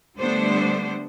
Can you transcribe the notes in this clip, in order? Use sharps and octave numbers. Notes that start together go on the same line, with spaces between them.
D3 G3 A3 B3 D4 C5